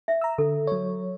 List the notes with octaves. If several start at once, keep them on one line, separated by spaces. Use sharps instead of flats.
E5
A#5 E6
D3 A4
F#3 C#5